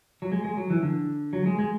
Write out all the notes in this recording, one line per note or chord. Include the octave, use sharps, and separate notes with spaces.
F#3
G#3
G#3
F#3
E3
D3
F#3
G#3
G#3